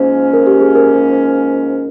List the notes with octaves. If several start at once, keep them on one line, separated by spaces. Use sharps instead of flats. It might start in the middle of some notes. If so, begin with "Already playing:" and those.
Already playing: G#2 F3 A#3 C#4 C5
A#4
G4
G#4
A#4